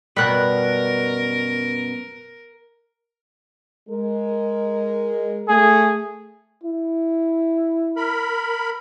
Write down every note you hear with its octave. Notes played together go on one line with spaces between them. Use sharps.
F#2 B2 G3 A#4 B4 F#6
G#3 A#4
A3 G#4
E4
A#4 B5